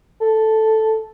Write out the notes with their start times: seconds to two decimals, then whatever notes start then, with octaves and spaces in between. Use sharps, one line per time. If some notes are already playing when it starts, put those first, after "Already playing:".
0.21 A4